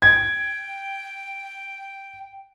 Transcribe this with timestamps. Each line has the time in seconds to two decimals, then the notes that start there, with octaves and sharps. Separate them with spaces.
0.02 G5 G#6